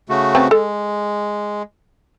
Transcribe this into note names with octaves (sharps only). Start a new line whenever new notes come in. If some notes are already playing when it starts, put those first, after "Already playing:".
C#3 A3 F#4
C4 B4 A5
G#3 A4